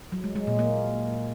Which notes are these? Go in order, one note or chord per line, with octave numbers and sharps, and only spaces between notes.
F#3
G#3
G#3
A#2
A#3